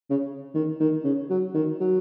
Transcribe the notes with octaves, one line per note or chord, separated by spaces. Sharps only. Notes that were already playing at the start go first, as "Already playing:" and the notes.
C#3
D#3
D#3
C#3
F#3
D#3
F#3